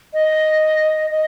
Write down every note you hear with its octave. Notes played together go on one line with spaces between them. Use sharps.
D#5
D#5